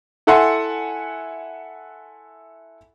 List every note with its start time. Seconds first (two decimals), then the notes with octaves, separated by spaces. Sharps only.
0.27 E4 A4 E5 F#5 G#5 C6